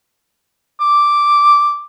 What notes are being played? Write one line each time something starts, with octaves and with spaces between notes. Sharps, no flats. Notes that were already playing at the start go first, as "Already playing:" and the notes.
D6